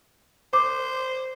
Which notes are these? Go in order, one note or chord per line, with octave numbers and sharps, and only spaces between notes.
C5 D6